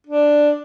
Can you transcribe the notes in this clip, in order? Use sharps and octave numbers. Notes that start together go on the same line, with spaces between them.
D4